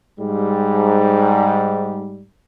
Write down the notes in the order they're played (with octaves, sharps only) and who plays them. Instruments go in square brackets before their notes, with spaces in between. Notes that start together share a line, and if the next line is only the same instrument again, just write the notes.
[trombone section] G#2 G3